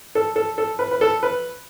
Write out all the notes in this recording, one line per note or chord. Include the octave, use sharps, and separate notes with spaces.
A4
A4
A4
B4
B4
A4
B4